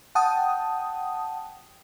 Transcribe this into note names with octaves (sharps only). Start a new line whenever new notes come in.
F#5 G5 A5 D#6